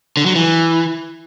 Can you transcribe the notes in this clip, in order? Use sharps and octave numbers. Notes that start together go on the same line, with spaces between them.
D3
F#3
E3